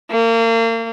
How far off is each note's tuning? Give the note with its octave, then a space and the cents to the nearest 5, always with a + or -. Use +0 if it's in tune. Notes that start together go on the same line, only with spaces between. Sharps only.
A#3 -35